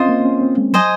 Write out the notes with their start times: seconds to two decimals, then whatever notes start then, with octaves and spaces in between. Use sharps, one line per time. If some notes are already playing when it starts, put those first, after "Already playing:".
Already playing: C4 C#4 F4 C5 D#5
0.09 A#3
0.25 C#4
0.41 C4
0.58 G#3
0.73 F#3 C5 D#5 G#5